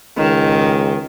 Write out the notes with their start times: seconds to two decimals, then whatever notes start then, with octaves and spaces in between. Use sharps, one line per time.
0.17 C#2 D#3